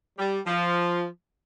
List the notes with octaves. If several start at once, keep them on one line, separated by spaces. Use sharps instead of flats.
G3
F3